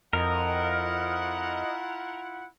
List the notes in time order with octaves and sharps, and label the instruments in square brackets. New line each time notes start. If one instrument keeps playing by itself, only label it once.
[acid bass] F2 [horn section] E4 F4 F#5 [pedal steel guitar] A#4 [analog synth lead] D#5